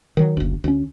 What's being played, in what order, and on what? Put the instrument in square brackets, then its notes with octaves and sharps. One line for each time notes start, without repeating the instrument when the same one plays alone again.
[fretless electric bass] D#3 F#3
F#1 D2
D2 C#4